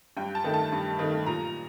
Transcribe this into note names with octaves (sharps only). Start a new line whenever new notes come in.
G2 G5
A5
D#3 A3
A5
G2
D#3 A3
A#2 A#5